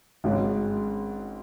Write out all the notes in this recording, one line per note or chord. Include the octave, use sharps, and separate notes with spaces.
G#1 G#2 F#3 C#4